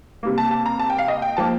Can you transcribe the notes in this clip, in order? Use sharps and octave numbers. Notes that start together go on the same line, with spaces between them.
C3 G3 A#3
A5
A5
A#5
A5
G5
F5
D#5
G5
F3 A#3 A5